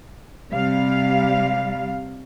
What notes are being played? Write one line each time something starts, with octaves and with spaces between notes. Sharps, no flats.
C3 G3 F5